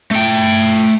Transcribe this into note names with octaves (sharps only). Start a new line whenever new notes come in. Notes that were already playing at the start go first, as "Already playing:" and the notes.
A3 G5